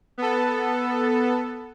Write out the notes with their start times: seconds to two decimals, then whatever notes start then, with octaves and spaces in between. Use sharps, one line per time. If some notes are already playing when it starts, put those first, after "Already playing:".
0.18 B3 A4